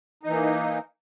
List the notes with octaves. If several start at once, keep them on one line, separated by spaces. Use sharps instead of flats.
E3 A#3 D#4